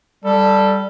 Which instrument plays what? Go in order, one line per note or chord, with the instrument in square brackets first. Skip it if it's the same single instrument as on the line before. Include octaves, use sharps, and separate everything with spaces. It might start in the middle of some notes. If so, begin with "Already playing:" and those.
[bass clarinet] G3 [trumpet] A4